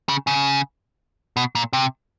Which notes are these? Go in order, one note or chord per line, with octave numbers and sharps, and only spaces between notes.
C#3
C#3
B2
A#2
C3